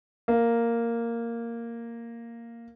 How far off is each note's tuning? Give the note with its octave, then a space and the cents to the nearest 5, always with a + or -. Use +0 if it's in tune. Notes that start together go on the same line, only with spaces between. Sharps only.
A#3 -5